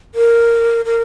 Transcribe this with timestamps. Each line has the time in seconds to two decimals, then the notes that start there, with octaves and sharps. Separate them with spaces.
0.15 A#4
0.85 A#4